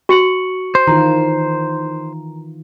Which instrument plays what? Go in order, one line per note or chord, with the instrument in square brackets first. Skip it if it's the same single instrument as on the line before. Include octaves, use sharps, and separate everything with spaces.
[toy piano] F#4 [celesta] C#6 C#7 F#7
[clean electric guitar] C5
[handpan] D#3 E3 F4 [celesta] A#5